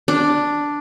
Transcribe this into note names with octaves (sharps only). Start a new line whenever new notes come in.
D4